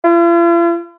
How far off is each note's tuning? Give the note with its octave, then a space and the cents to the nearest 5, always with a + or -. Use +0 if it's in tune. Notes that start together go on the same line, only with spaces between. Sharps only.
F4 -45